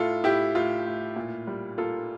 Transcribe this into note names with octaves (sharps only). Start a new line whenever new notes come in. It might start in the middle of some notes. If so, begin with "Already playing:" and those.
Already playing: A2 F4 A4
A2 E4 G4
A2 F4
A2
A#2
G3
A#3 F4 A4